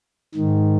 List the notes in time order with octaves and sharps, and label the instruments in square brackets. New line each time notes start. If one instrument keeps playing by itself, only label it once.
[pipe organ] G#2 D#3